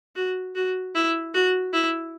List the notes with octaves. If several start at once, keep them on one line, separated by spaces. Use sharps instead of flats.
F#4
F#4
E4
F#4
E4